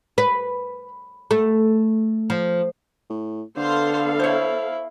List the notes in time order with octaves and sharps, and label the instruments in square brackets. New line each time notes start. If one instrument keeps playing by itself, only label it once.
[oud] B4
A3
F3
[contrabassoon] A2
[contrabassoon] D3 [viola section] B3 A4 F5 [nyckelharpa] C5 C6
[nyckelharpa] E4 [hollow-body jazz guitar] C5 C#5